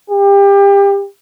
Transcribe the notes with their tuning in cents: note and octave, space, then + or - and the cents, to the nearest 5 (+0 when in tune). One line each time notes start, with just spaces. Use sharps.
G4 +30